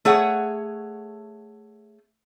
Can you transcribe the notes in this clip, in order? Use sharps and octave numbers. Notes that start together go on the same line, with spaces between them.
A3 G#4 C#5 F#5